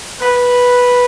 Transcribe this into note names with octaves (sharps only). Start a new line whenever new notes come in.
B4